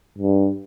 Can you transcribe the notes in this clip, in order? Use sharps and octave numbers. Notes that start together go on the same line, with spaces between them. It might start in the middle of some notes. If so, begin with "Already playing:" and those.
G2